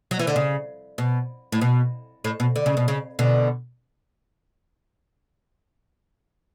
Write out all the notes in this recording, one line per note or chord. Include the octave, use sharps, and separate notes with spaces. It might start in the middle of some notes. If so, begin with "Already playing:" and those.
F#3
E3
D3
C#3
B2
A2
B2
A2
B2
D3
C#3
B2
C#3
B2 D3